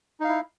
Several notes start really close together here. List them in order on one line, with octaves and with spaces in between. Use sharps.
D#4 F5 E4